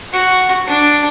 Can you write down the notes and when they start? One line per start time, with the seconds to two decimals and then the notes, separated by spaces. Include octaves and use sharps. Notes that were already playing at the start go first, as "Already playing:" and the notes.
0.13 F#4
0.67 D4